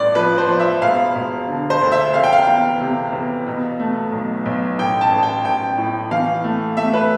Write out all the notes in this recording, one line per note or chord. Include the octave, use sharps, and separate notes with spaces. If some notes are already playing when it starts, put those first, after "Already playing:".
Already playing: A1 G2 D5
F3 B4
C5
F3
E5
E1 F5
E1
D3
C5
D2
E5
F1 F5
G5
F5
E2
C3
E2
B2
A3
B1
B1
A1 G5
A5
A1
G5
A1 G5
A2
E3 F5
A3
A3 E5
B4